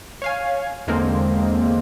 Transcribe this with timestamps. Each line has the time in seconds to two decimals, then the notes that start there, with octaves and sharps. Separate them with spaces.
0.22 C#5 F5 G#5
0.87 E2 D3 G#3 A#3 C4